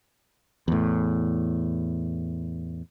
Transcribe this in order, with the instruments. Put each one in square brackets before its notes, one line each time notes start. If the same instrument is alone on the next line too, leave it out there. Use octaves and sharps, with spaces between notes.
[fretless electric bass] E2 A2